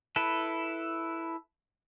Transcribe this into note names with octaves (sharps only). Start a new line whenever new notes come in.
E4 A4 B4